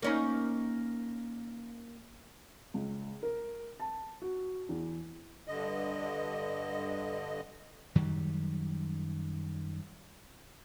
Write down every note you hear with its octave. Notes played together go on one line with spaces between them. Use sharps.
A#3 C#4 D#4
C#2
A#4
A5
F#4
E2
G2 D3 D#5
F#2 D#3 F#3 G3